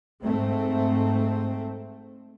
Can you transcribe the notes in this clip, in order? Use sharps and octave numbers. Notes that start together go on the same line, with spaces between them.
G#2 A3 C4